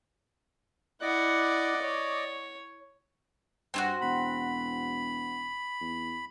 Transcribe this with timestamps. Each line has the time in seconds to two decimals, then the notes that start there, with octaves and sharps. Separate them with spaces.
1.02 E4 D5 D#5 F#5 D6
1.82 C#5
3.74 G2 C4 E4 F#4
4.01 E1 B5
5.80 E2